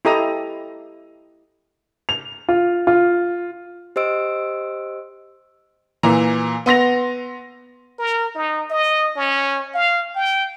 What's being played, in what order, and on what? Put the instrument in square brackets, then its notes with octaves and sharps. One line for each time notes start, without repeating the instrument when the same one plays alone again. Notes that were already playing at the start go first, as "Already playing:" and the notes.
[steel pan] E4 G4 A4 D#5 A#5 D#6
[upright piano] F7
F4
F4
[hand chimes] G4 C5 D#5 E6 D7
[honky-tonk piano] A#2 E3 A#5
B3 C6 A#6 F7
[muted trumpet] A#4
D#4
D#5
C#4
F5
G5